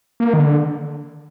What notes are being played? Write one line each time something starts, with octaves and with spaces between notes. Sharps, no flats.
A#3
D#3
D3